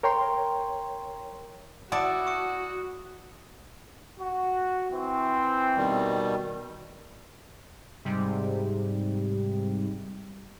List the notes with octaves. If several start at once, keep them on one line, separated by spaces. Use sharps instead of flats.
A#4 C#5 G5 A#5 C6
E4 F#4 D5 F#5 A5 D#6 C#7
C#6 D#6 C#7
F#4
E3 C4
B2 D#3 G3
G#2 C3 G3